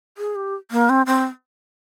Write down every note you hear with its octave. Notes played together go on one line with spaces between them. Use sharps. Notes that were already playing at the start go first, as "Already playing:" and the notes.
G#4
G4
A#3
C4
C4